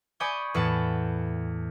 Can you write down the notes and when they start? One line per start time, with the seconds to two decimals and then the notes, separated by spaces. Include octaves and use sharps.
0.20 D5 G#5 B5 C#6 D#6 G6
0.55 E2 A2 F#5 A5